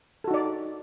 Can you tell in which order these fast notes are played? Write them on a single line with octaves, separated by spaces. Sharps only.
A4 F#4 D#4 D5